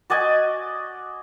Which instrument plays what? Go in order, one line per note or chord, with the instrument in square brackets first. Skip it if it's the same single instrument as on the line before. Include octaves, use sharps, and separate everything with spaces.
[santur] F#4 D5 D#5 G#5